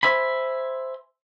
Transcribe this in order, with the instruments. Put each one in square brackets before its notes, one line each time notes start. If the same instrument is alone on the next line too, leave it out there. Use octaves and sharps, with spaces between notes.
[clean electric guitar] C5 E5 G#5 B5